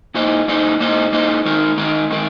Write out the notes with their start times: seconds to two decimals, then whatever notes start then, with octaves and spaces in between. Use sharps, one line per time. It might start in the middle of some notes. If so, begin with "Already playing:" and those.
0.14 A#2 A#3 D#4 C5 D#5
0.48 A#2 A#3 D#4 C5 D#5
0.80 A#2 A#3 D#4 C5 D#5
1.12 A#2 A#3 D#4 C5 D#5
1.45 D#3 G#3 D#4 A#4
1.78 D#3 G#3 D#4 A#4
2.10 D#3 G#3 D#4 A#4